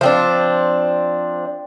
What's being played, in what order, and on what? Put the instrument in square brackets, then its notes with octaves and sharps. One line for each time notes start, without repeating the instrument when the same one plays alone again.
[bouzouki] F3 C4 D4